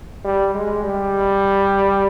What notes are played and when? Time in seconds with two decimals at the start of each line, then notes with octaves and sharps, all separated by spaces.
0.25 G3
0.54 G#3
0.84 G3